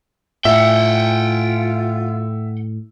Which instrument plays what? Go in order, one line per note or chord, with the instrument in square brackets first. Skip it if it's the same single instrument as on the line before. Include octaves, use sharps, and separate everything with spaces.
[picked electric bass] A2 [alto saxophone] F4 [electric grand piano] E5 [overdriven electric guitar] F#5 G5